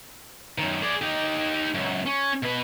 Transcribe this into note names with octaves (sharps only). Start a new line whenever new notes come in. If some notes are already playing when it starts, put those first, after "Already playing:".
F#2 D#3
G#4 D5
D#4 G4
C#2 F#2
C#4
B2 B4